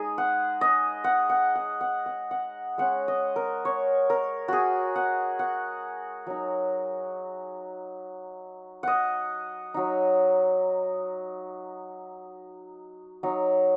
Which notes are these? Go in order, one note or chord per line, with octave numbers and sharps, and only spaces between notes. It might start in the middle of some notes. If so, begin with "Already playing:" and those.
Already playing: G#3 D#4 G#4 D#5
F#5
D#5
F#5
F#5
F#5
F#5
F#5
F#5
G#3 C#4 F#5
D#5
A#4
C#5
A#4
F#4 G#4
F#5
F#5
F#3 D#4
D#5 F#5
F#3 D#4
F#3 D#4